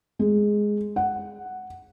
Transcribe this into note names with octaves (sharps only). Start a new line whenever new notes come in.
G#3
F#5